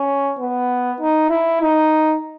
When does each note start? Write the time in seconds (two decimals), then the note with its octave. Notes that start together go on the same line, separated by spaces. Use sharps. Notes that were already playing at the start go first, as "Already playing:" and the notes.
Already playing: C#4
0.39 B3
1.00 D#4
1.30 E4
1.61 D#4